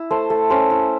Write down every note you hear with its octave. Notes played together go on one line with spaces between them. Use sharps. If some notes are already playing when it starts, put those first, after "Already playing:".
Already playing: E4
A3 C5
A3
C#4 C5
E4